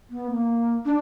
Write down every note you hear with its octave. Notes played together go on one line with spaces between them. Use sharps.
B3
A#3
D4